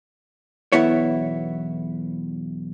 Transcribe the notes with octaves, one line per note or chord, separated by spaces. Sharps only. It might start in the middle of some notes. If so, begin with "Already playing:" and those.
B1 E2 B3 E4 C#5